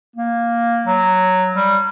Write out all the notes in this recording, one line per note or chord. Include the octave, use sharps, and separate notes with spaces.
A#3
F#3
G3